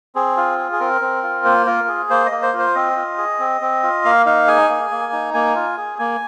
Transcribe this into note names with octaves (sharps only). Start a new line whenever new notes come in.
C4 G#4
F4
G#4
G#4
C4 A#4
C4
F4
A#3 C5
F4 A#4
G#4
A#3 C5
D#5
A#3
C5
F4
C5
C4 D#5
F4
G#4
C4
C4
F4
A#3 F5
D#4 F5
G#4 G#5
A#3
A#3
D#4
A#3 G#5
F4
G#4
A#3 G#5